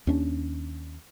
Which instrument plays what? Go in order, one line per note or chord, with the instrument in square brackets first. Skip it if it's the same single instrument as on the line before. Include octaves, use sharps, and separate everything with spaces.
[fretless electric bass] D#2 C#4 D4